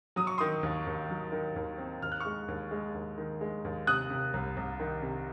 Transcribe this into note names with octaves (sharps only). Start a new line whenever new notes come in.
F#3 D#6
C#6
D#3 C6 D#6
D#2
D#2
F#3
D#3
D#2
C4
D#2 F6
F#6
G#3 C#6 F6
D#2
G#3
D#2
D#3
G#3
D#2
C3 D#6 F#6
C3
C2
C2
D#3
C3